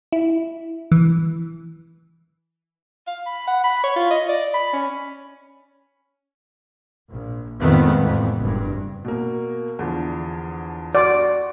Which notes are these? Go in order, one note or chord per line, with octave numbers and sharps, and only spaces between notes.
E4
E3
F5
B5
F#5
B5
C#5
F4
D#5
D5
B5
C#4
A#1
F2 A2 D#3 G#3 A3 B3
A1 F2 E3
F#1 G2
B2 A#3
E2 D3 F3
F#4 D5 C6